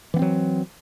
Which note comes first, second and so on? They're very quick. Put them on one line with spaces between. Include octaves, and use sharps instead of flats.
E3 B3 C4 F#3